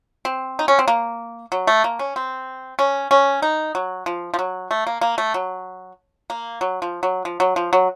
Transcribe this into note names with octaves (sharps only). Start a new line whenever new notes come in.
C4
D#4
C#4
C4
A#3
F#3
A3
A#3
C#4
C4
C#4
C#4
D#4
F#3
F3
F3
F#3
A3
A#3
A#3
A3
F#3
A#3
F#3
F3
F#3
F3
F#3
F3
F#3